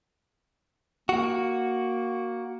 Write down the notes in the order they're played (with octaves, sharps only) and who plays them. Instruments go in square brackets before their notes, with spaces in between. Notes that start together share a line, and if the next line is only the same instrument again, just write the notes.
[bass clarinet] A#3 [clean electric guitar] F#4